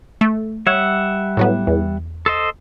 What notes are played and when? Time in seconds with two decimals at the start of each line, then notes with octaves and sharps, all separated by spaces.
0.21 A3
0.67 G3 C#5 E5 F#5
1.37 A2 F#3 B3
1.67 E2
2.26 A4 C5 D#5